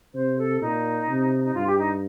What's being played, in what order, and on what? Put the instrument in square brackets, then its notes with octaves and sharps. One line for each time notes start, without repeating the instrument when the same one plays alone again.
[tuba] C3 [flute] C5
[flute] A4
[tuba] A#2 [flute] D#4
[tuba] C3
[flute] D#4
[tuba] G2 [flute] F4
[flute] G4
D#4